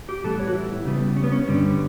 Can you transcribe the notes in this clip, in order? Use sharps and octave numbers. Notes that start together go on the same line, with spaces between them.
G4
A2 E3 G3 B3 A4
C#5
F#4
E4
C#3 G3 B3
C#4
B3
C#4
G2 D3 G3 B3